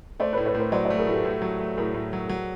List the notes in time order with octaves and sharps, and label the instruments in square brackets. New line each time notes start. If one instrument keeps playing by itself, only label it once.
[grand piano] A3 [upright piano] C5 D5
[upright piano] B4 C#5
[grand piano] A2
[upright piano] B4 C#5
[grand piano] A2 [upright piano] A#4 C5
[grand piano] F#3 [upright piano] C5 D5
[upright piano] C5 D5
[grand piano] A3 [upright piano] A4
[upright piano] G#4 A#4
[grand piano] A2 [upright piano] G4 A4
[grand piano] A2
F#3
A3
[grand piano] A2 [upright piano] G#4 A#4
[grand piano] A2
F#3
F#3